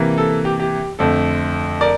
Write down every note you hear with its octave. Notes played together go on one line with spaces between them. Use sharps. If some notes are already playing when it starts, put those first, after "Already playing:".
Already playing: C3 E3 A#3
A4
G4
G4
F2 D3 A3 A4
A#4 D5